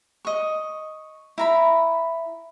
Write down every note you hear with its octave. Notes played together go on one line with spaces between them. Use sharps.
D#5 C#6
E4 A#5 B5